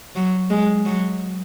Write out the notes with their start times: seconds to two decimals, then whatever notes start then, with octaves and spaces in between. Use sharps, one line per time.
0.15 F#3
0.50 G#3
0.85 F#3